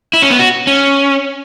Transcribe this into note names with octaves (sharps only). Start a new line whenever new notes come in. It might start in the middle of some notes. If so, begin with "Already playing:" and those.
E4
C#4
B3
F#4
C#4